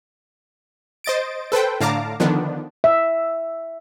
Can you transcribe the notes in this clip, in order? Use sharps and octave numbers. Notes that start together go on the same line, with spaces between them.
C5 D#5 A6 D7
A4 B4 C5 G5
A2 D3 F5 A5 A#5 D6
D3 D#3 F3 B3 D4
E5